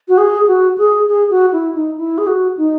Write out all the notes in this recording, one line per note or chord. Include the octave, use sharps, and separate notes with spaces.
F#4
G#4
F#4
G#4
G#4
F#4
E4
D#4
E4
G#4
F#4
D#4